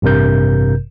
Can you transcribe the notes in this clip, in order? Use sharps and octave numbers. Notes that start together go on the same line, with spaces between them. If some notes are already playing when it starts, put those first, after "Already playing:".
A1 G2 C3 A#4 G6